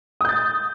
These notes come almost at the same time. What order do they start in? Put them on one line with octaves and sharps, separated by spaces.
D#6 G6 A6